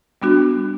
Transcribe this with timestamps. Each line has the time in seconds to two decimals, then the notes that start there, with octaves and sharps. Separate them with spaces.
0.22 G3 B3 D4 F#4